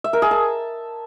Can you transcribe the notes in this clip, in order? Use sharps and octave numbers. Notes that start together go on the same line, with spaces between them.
E5
A#4
G#4
A5